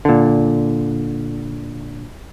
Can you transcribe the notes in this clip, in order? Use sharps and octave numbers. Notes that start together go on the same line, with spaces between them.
A#2 D3